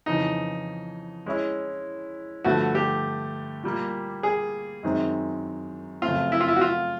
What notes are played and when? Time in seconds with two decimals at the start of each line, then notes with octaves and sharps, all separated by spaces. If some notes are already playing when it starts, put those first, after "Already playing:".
0.06 F2 C#3 E3 D#4
1.26 G#3 C#4 E4
2.44 G2 D3 F3 A3 F#4
2.75 G4
3.64 A#2 G3 A#3
4.23 G#4
4.83 F#2 D#3 G#3 C4 D#4
6.02 F#2 C#3 F3 A3 C4 F4
6.32 E4
6.41 F4
6.48 E4
6.56 F#4
6.61 F4